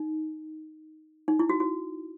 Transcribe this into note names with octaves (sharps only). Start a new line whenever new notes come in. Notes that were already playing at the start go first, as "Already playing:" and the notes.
Already playing: D#4
D#4
E4
F#4
F#4